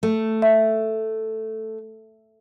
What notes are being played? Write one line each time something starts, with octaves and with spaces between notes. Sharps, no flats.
A3
E5